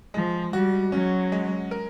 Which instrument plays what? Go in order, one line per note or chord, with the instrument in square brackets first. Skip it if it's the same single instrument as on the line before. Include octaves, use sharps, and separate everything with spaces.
[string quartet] F3 [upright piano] G#3
[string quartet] G3 [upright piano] F#4
[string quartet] F#3 [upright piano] C#4
[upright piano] G#3
A#4